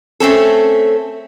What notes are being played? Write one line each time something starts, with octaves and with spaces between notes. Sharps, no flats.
A3 C4 C#4 A4